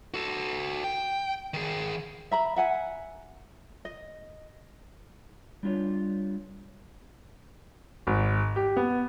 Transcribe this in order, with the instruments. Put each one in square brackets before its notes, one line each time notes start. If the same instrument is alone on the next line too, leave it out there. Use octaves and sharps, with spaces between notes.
[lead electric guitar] F#4 A4
G5
D#3 G#4
[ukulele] E5 A#5 B5
E5 F#5 G#5
D#5
[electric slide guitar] G3 D4 F4 C#5
[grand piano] G#1
G4
B3